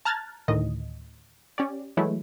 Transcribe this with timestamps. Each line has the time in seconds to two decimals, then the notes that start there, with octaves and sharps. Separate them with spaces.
0.05 A5 A#5 F6 F#6 G#6 A6
0.48 D2 A2 D#3 D#5
1.58 C#4 G4 D5
1.97 E3 F#3 G#3 A3 E4